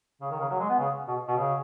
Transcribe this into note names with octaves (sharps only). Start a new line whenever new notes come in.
C#3
D#3
C#3
F#3
G#3
B3
C#3
B2
B2
C#3